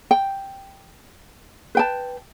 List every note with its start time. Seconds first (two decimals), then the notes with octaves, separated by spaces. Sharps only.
0.11 G5
1.75 B4 G5 A5